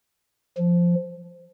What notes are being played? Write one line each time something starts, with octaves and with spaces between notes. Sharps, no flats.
F3